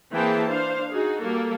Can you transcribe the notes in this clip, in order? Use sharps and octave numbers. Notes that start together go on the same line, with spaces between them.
E3 A#3 C4 G#4 G5 A5
D4 C5 F5
D#4 F#4 G#4
G3 A#3 A4